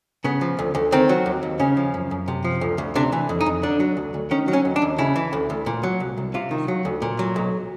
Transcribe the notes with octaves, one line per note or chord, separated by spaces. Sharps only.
C#3 B3
F3
D2
D2
D#3 C4
F#3
D#2
D#2
C#3 C#4
F3
F#2
F#2
C3
F3
D2
D2
C3 D4
E3
F2
D#4
F2
D3 D4
F#3
D2
D2
D#3 C#4
F#3
C#4
D#2
D4
D#2
C#3 E4
E3
D2
D2
A#2
F#3
C2
C2
C3 F4
D#3
F#3
D2
A#2
F#3
B1